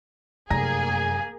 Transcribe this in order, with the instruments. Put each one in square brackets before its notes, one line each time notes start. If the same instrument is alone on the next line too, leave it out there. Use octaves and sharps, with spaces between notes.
[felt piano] F1 A#5 A#6 [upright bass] F#2 [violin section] A#3 G#4 [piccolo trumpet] G#5